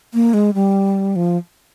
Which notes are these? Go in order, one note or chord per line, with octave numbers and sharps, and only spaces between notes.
A#3
G#3
G3
F3